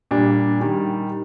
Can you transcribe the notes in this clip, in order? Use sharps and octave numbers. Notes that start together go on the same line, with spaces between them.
A#2 G3 D4
D#3 G3